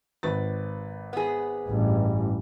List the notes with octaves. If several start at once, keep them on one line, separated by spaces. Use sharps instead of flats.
G#1 B4 A6
B3 G#4
A1 G2